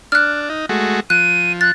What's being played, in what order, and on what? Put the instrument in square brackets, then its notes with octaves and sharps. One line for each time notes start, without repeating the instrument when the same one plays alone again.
[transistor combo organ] D4 [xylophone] F6 F#6
[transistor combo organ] D#4
G#3 A3 F#4
[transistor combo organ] F3 [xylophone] F#6 [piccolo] D#7
[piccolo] F#6 [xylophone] A6